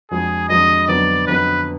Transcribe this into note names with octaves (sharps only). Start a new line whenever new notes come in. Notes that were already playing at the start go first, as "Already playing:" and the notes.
F2 F3 G#3 D4 F#4 G#4
F2 F3 G#3 D4 F#4 D#5
F2 D3 F#3 B3 D#4 D5
F2 D3 F#3 B3 D#4 B4